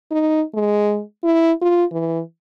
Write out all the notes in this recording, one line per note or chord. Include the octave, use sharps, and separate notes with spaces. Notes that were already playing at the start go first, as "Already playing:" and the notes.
D#4
G#3
E4
F4
E3